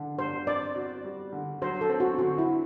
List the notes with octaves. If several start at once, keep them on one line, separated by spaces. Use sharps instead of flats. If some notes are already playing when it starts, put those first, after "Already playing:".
Already playing: D3 D4
G2 C5
C4 D5
F#4
G3
D3
F#3 C5
A4
C4
F#4
D3 F#4
E4